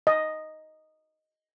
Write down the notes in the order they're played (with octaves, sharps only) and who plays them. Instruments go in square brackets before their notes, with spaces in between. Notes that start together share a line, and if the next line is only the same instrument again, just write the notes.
[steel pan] D#5